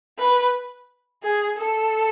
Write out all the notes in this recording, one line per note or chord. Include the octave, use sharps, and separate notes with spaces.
B4
G#4
A4